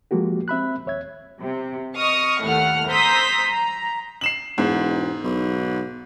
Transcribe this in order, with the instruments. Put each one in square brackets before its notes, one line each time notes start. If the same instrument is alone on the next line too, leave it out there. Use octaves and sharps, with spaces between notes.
[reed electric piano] F3 G#3 A#3 F#4 G4
C4 E5 B5 F#6
D#2 C#5 E5 G#6
[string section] C3
D#5 C#6 D#6 F6
D#2 A2 A3 F#5 F6
C5 A#5 D#6 E6 G6 B6
A#5
[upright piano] C7 E7 F#7
[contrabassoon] E1 [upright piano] G#2
[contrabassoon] B1